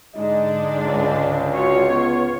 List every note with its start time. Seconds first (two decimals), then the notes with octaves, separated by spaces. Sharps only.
0.16 G#2 D3 G#3 D4 D#4 D#5
0.84 C#2
1.53 F4 F#4 C#5
1.88 B3